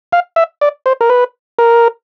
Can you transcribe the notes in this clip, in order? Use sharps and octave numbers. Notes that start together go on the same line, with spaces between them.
F5
E5
D5
C5
A#4
B4
A#4